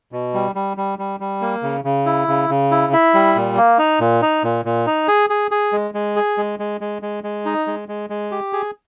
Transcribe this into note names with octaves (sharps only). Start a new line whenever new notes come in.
B2
G3
G3
G3
G3
G3
A#3
C#3
C#3
E4
C#3
C#3
E4
E4
G3
A#2
A#3
D#4
A#2
D#4
A#2
A#2
D#4
G#4
G#4
G#4
G#3
G#3
G#4
G#3
G#3
G#3
G#3
G#3
D#4
G#3
G#3
G#3
G4
G#4